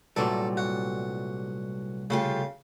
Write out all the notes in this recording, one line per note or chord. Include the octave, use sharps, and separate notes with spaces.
C2 A#2 E3 F#3 G3 A3 A4
F#4
C#3 A3 F4 G4